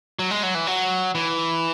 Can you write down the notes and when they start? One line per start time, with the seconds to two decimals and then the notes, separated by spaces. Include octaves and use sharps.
0.19 F#3
0.31 G#3
0.43 F#3
0.55 E3
0.67 F#3
1.15 E3